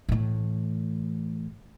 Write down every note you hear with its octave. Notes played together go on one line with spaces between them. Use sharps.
A2 E3